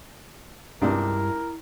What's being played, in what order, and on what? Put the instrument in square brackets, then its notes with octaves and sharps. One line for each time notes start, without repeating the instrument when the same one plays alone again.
[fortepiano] C#2 C3 D4 [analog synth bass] G2 [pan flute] E4 [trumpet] A#4